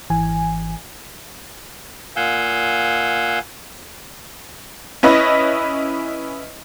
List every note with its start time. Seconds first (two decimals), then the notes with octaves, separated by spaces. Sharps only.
0.10 G#1 E3 G#5
2.16 A#2 F5 F#5 G#5 E6 G6
5.03 C#4 E4 B4 D#5